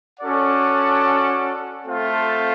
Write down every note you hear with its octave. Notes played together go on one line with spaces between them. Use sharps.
C#4 F#4 A4 D5 F#5
A3 C4 F4 A4 C5